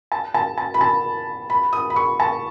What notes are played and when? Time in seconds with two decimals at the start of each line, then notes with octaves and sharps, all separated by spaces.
0.12 A5
0.34 A5
0.58 A5
0.74 B5
0.81 A5
1.50 B5
1.73 D#6
1.90 B5
1.96 C#6
2.20 A5